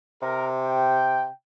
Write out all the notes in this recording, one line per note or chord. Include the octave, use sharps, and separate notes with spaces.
C3 A#4
G5